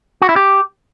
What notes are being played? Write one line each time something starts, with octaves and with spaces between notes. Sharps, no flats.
F#4
E4
G4